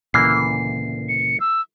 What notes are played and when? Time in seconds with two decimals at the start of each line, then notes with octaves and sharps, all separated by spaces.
0.14 D2 A#2 C#3 E3 A#3 C7
1.09 C#7
1.40 E6